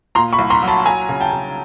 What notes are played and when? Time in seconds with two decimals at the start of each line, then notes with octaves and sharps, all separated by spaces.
0.15 A#2 A#5 C6
0.33 B5 C#6
0.39 C2
0.50 A#5 C6
0.62 F#3
0.68 A5 B5
0.86 F#3 G#5 A#5
1.09 C#3
1.21 G5 A5
1.33 C#3